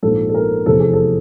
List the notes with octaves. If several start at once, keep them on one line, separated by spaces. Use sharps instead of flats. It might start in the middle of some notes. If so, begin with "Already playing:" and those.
A#1 G#2 F3 A4
A4
A#4
F1 E2 C3 E3 A4
G#4
A4